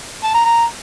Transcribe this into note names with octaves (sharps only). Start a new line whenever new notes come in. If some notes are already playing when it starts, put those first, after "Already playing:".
A5
A#5
A#5